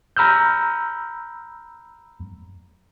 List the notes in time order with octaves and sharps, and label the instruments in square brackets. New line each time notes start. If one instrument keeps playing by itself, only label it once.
[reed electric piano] A#5 B5 E6 F6 G6